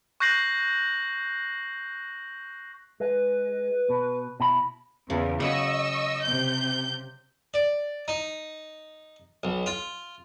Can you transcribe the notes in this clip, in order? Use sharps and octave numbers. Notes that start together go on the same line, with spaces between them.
C#6 F#6 G6 A#6 C7 F#7
G#3 B4
B2
B2 E4 B5
E2 C#3
C#3 F#3 D#5 F#5 C#6 E6
C3 G6
D5
D#4
B1
F4